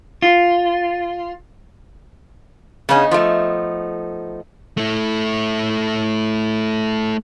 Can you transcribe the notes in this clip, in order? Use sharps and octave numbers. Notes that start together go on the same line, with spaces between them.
F4
C#3 B3 C#4 D#4
F3 A3
A3 E4